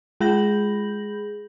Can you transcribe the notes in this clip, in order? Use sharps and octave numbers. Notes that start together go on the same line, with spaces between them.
G#3 G#4 B5 G6 A#6 F#7